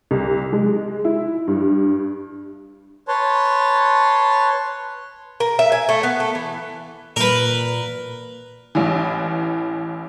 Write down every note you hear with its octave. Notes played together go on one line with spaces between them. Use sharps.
C2
G#3
E4
G2
B4 C#5 A5 C6
A#4
E5
G#5
A3
B3
A3
E3
A#2 A#4 B4
A1 E3